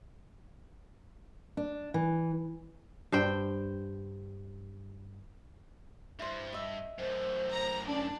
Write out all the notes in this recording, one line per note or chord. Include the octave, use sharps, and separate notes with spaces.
D4
E3
G2 C5 G5
G2 E4 C5
D#5 E5
F#2 A2 C5
A#5
C#4 D4